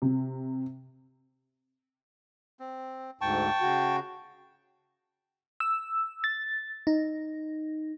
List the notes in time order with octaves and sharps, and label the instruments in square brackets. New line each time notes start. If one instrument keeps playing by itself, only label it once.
[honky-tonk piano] C3
[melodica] C4
[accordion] D2 G#2 [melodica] G5 A5 C#6
[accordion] C#3 F#4
[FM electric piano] E6
A6
D#4